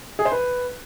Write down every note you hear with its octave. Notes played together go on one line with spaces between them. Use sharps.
G#4
C5
B4